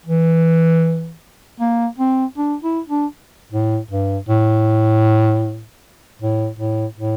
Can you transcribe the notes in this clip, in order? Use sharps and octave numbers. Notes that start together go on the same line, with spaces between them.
E3
A#3
C4
D4
E4
D4
A2
G2
A2
A2
A2
A2